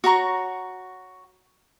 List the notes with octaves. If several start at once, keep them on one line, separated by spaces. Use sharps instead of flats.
F#4 C#5 A#5 C#6